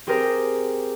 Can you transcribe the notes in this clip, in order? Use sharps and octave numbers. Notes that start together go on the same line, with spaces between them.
C4 G4 G#4 A#4 C5